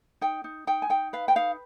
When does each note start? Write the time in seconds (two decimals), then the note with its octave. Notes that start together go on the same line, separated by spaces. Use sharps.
0.21 D#4 G5
0.44 D#4
0.67 D#4 G5
0.82 G#5
0.90 D#4 G5
1.13 B4 F5
1.28 G5
1.36 D#4 F5